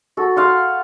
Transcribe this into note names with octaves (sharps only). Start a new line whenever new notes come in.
F#4 A4
F5 F#5 C6